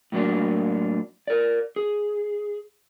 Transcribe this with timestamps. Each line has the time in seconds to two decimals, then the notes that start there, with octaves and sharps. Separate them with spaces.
0.12 A2 F#3 A#3 D4
1.27 A#4 D5
1.76 G#4